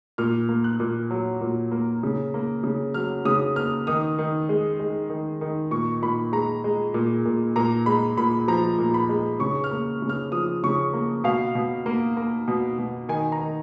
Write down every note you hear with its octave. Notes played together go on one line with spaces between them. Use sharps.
A#2 F6
A#3
F#6
A#2
F#3
A#2
A#3
C#3
A#3
C#3
F#3 F6
C#3 D#6
A#3 F6
D#3 D#6
D#3
G#3
G#3
D#3
D#3
A#2 C#6
A#2 B5
G#3 A#5
G#3
A#2
A#2
A#2 A#5
G#3 B5
A#2 B5
F3 A#5
A#2
B5
G#3
C#3 C#6
F6
A#3
C#3
F6
F3 D#6
C#3 C#6
A#3
B2 F5
B2
A#3
A#3
B2
B2
D#3 G#5
A#5
D#3